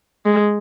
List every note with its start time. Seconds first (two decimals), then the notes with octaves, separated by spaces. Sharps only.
0.26 G#3